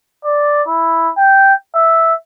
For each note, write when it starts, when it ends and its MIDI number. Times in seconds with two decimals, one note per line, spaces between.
0.25 0.62 74
0.68 1.10 64
1.17 1.54 79
1.75 2.14 76